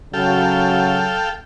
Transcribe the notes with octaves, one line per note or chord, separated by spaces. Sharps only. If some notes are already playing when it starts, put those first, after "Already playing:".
C#3 F#3 A4 F5 G5